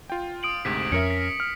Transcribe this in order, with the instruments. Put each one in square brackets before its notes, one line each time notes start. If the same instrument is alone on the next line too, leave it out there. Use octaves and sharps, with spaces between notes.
[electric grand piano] F4 G5
[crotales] D#6 D7 F#7
[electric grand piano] D2 G#2 C3 [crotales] B6
[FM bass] F2 [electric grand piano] C#4 A#4 E5 [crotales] C#7
[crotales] B6
[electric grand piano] F6